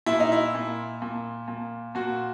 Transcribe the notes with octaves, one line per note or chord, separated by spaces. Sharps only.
A#2 E4
D#4
E4
A#2
A#2
A#2
A#2 F#4